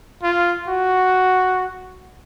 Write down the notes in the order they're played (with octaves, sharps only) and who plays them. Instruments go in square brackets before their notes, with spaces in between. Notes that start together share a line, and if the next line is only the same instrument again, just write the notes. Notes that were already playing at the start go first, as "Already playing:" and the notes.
[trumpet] F4
F#4